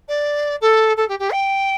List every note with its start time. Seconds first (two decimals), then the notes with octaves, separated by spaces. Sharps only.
0.08 D5
0.61 A4
0.97 A4
1.08 G4
1.19 G4
1.31 G5